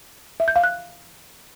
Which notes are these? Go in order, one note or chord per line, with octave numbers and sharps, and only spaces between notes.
E5
G6
F5
F#6